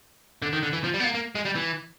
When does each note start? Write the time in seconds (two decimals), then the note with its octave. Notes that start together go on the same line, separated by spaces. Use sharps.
0.42 D3
0.53 D#3
0.63 D3
0.73 E3
0.84 F3
0.94 G3
1.00 B3
1.04 A#3
1.14 A#3
1.35 G#3
1.45 G3
1.55 E3